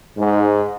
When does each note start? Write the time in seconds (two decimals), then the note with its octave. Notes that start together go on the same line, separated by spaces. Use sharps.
0.18 G#2